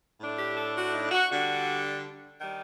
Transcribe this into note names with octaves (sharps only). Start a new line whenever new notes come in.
A2 A3 D4
G4
A4
F#4
D#4
F#4
D3 G3 D4 F#4
D#3 G3